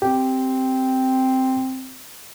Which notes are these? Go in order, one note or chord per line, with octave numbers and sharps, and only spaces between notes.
C4 G4